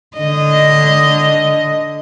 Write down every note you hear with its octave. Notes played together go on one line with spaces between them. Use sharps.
D3 D#5